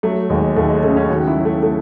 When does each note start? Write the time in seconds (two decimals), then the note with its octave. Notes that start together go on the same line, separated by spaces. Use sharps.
0.03 F#3 A3
0.30 D#2 G#3
0.56 D#2 A3
0.70 G#3
0.83 C#3 A3
0.97 C#4
1.10 D#3 F#4
1.27 E4
1.36 F#3
1.45 A3
1.63 A3